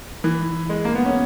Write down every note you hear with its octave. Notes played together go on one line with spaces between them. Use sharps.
E3
G#3
A#3
B3
C#4